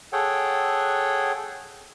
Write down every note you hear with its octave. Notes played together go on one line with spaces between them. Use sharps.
G#4 A4 C#5 F#5 G5